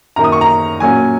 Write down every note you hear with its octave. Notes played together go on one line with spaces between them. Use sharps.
F#2 D#3 A#3 A#5
D#6
C#6
A#5
A#2 F#3 A#3 C#4 G#5